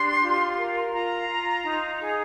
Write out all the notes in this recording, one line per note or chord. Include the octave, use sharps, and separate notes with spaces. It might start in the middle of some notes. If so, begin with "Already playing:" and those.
Already playing: D4 G4 C6
F4
A#4
F4 A#5
F4
D#4
G#4